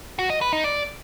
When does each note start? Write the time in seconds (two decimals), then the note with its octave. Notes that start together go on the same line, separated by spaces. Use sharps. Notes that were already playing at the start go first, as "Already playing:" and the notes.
0.19 F#4
0.30 D#5
0.41 B4
0.53 D#4
0.64 D5